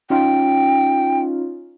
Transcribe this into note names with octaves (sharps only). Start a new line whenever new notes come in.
C#4 D#4 F4 G5